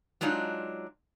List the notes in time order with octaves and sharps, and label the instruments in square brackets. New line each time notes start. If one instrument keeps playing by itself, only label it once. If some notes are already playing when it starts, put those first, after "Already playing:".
[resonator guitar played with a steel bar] F#3 G#3 D4 D#4 F4